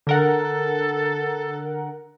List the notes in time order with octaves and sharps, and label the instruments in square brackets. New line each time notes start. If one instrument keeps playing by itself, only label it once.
[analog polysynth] D3 A#4 F#5 [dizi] A4